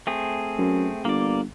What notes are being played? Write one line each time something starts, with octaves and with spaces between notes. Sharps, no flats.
A3 C4 G#4
F#2
G1 A#3 D5